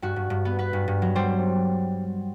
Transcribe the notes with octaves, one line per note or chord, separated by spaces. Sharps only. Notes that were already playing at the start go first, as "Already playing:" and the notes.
G2 F#4
G2
G2
B3
B3 B4
G2
G2
F#3
G3 C5